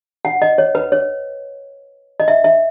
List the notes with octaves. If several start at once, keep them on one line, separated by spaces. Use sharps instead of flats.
F#5
D#5
C#5
B4
C#5
D#5
E5
E5